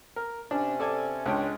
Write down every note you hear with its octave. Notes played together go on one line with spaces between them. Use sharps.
A#4
C3 C#4 D4
A4 D5 G#5
C#2 G#3 C#4 D4 G5